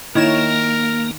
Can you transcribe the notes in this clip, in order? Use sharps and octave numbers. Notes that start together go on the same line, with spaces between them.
D#3 A#3 E4 A#4 C#5 E7